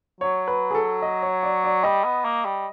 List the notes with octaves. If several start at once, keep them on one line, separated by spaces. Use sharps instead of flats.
F#3 C#5
B4
G#4
A4
D#5
C#5
D5
D5
G3 D#5
B3
A#3
G3